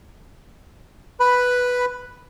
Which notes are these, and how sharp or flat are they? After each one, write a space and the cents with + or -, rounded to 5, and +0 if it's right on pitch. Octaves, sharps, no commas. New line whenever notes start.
B4 +0 B5 +0